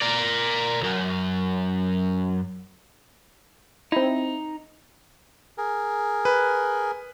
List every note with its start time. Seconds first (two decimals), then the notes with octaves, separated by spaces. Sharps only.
0.02 A#4 D5
0.80 C2 F#2
3.92 C4 D#4 E4
5.58 G#4 A#4
6.25 B4